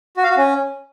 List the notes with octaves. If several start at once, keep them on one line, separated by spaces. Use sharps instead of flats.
F#4
F5
F#4
C#4